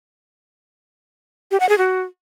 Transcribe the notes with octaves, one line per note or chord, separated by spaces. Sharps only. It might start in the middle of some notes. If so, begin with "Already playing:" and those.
G4
F#5
G#4
F#4